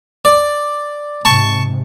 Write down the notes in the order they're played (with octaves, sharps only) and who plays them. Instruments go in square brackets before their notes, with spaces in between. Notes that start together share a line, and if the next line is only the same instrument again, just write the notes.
[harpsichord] D5
[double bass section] G#2 C3 [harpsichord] A5 C#6